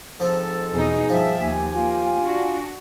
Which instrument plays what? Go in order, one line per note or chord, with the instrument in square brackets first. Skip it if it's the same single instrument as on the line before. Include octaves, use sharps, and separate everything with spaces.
[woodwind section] G#2 A4 [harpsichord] F3 C4
[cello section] E2 B2 D#4 [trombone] G#4
[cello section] G2 E5 [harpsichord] F3 [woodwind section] F5 G5 A5
[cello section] D#2 [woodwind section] G4 G#5
[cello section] A#3 [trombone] F4
[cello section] D4 F#4